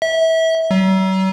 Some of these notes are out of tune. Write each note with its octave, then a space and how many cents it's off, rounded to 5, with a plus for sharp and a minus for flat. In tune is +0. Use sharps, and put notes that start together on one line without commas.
E5 -25
F#3 +45